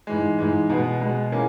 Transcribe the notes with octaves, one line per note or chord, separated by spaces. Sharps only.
G#2 E3 G#3
G#2 E3 G#3
B2 G#3 B3
B2 G#3 B3
E3 A#3 C#4 G#4